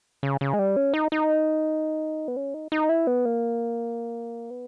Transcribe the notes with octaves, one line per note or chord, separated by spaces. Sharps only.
C#3
C#3
G#3
G3
C#4
D#4
D#4
B3
C#4
D#4
D#4
E4
B3
A#3
B3